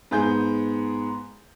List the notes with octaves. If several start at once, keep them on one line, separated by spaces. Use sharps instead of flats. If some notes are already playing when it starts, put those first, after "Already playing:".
G#2 B3 G#4 G6